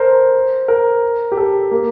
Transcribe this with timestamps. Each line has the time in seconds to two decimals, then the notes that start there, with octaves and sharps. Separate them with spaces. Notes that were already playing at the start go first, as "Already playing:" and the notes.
Already playing: A4 A#4 C5
0.68 A#4
1.32 G4
1.37 A4
1.71 A#3